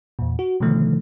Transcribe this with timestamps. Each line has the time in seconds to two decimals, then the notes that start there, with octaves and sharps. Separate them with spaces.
0.19 E2 A#2
0.39 F#4
0.60 B2 D3 D#3 F3 A3